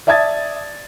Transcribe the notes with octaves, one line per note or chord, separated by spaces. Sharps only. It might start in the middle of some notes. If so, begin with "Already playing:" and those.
D5 E5 A5 D#6 G#6 A6